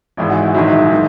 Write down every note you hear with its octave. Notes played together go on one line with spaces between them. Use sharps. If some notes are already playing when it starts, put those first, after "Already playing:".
G#1 G#2 E3 G#3 E4
F#4
E4
A#1 G#2 D#3 F#3 E4
D#3 G#3